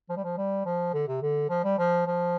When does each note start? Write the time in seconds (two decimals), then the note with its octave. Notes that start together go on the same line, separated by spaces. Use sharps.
0.09 F3
0.17 G3
0.24 F3
0.37 G3
0.66 F3
0.94 D3
1.08 C3
1.22 D3
1.50 F3
1.64 G3
1.78 F3
2.07 F3